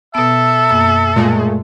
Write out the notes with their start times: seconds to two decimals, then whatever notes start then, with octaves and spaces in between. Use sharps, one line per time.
0.15 B2 B3 A4 E5
0.69 F#2 A#3 A#5
1.16 A#2 G#3 A3